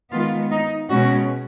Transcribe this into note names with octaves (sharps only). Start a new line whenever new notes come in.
D#3 G#3 B3 F4
D#4
B2 G#3 C#4 F#4